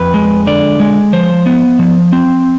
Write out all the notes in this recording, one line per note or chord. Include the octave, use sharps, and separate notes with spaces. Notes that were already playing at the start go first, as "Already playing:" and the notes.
Already playing: F2 B4
G#3
D3 D5
G#3
F3 C5
B3
F3
C4